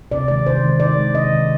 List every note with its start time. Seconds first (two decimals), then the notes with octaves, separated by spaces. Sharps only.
0.11 C3 D5
0.28 D#3 G#3 D5
0.45 C3 C5
0.64 D#3 G#3
0.80 C3 D5
0.98 D#3 G#3
1.14 C3 D#5
1.32 D#3 G#3